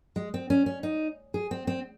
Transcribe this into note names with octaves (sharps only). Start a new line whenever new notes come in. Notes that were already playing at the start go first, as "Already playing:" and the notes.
G#3
C4
C#4
C#4
D#4
G#4
C4
C4